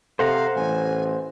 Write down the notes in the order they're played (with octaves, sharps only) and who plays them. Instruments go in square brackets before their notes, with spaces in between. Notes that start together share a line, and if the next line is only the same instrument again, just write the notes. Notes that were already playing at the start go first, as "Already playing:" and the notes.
[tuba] C3 [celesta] A4 [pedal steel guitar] C5 F#5 A#5 [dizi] F5
[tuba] A1 [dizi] G#5